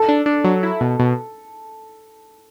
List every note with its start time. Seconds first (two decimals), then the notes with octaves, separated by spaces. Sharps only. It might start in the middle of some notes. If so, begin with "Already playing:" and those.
Already playing: A4
0.09 D4
0.26 D4
0.44 F#3
0.63 E4
0.81 B2
1.00 B2